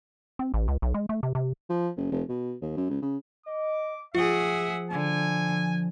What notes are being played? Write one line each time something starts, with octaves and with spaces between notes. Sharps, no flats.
C4
A1
C#2
B1
G#3
A3
C3
C3
F3
F#1
F1
B2
D#2
F#2
C#2
C#3
D#5 D6
F3 F4 G#4 E5 F#5
D3 G#5